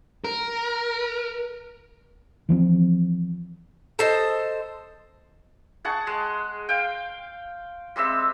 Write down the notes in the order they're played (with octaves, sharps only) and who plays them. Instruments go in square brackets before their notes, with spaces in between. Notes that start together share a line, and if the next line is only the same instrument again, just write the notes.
[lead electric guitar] A#4
[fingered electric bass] E3 F3 G#3 C4
[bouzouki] A4 C5 D#5
[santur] G#4 F#5 A5 C#6
G#3
F5 G5
G3 G#3 C4 E5